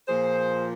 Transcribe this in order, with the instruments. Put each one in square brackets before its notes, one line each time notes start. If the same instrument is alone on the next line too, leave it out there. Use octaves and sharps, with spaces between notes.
[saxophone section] A#2 F3 A#3 G#4 C5